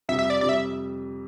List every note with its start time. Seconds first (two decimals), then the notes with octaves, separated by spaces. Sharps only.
0.09 F2 C3 G3 E5
0.19 E5
0.30 D5
0.41 F2 C3 G3 D5
0.49 E5